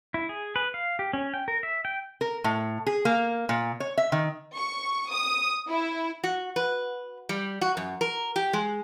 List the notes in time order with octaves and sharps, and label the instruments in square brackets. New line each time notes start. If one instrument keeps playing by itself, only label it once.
[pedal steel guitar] E4
G#4
B4
F5
G4
C#4
G5
A#4
E5
G5
[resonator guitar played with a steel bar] A#4
A2
G#4
A#3
A#2
C#5
E5
D#3
[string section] C#6
D#6
E4
[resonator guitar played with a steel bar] F#4
B4
G3
F#4
F#2
A#4
G4
G#3